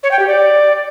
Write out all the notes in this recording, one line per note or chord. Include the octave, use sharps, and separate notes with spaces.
C#5
G5
G4
D5